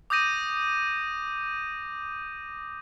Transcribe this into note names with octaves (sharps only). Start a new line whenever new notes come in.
D6 D#6 G6 A#6 D#7